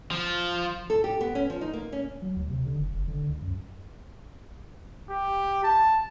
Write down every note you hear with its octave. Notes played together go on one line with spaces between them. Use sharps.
F3
A4
G4
B3
C#4
F3
D#4
A#3
C#4
F#3
D2
C3
D3
F#1
F#1
D3
C#2
F#2
G4
A5